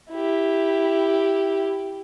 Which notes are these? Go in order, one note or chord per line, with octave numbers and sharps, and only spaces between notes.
E4 G4